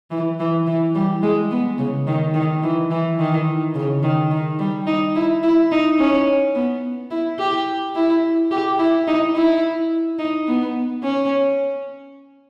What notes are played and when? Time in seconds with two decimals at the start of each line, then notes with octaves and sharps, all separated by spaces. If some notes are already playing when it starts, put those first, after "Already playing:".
0.11 E3
0.39 E3
0.67 E3
0.95 G3
1.23 G#3
1.51 B3
1.78 C#3
2.07 D#3
2.34 D#3
2.63 E3
2.91 E3
3.19 D#3
3.75 C#3
4.03 D#3
4.31 D#3
4.59 G3
4.87 D#4
5.15 E4
5.43 E4
5.71 D#4
5.99 C#4
6.55 B3
7.11 E4
7.39 G4
7.95 E4
8.51 G4
8.79 E4
9.07 D#4
9.35 E4
10.19 D#4
10.47 B3
11.03 C#4